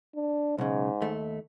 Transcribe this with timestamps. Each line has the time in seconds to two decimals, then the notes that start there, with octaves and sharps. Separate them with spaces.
0.15 D4
0.58 B1 G#2 C#3
1.02 D#2 A3